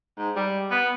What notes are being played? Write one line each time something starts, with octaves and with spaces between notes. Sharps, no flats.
G#2
G3
B3